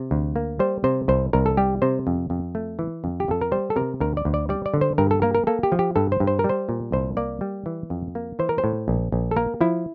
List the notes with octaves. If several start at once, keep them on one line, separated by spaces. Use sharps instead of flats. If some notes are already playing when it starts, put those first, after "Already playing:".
Already playing: C3
D2
A#3
G3 C5
C3 C5
C2 C5
C2 A#4
A4
G3 G4
C3 C5
F2
F2
A3
E3
F2
G4
F2 A4
A#4
G3 C5
A4
C3 A#4
D2 A#4
D5
D2
D5
G3 D5
D5
D3
C5
G2 A#4
A4
A#3 A#4
A#4
A#3 A4
G4
F3
G4
G2 A4
C5
G2
C5
A#4
G3
C5
A#2
C2 C5
A#3 D5
G3
E3
F2
A#3
E3 C5
A#4
C5
A2
A#1
A#1
A4
A#3 A#4
F3 E4